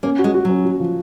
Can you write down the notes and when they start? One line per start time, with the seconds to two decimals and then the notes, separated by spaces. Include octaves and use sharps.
0.03 A#3 C#4
0.19 F#4
0.24 G#3
0.34 F#4
0.45 F#3 C#4
0.65 F#4
0.80 F3